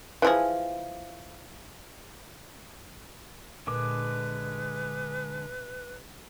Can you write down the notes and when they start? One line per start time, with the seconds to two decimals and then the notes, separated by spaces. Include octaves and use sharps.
0.22 E3 F3 G#4
3.67 A#2 D3 G#3 B4 D6